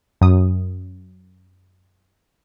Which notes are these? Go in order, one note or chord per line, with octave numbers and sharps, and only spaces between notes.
F#2 D#6